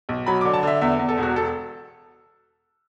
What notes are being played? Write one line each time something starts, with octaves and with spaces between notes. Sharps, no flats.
B1
F#3 B5
D3 D6
A5
D3 E5
E2 E5
E2
A4
E1 F#4
A4